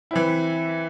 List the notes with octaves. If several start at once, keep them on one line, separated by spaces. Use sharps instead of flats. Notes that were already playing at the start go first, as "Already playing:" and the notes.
E3 C4 E4